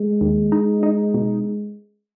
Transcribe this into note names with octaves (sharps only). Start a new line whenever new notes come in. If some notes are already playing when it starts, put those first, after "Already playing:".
Already playing: G#3
D#2
D#4
D#4
B2